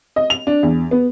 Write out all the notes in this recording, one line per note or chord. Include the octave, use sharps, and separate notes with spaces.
D#5
F7
D4
E2
B3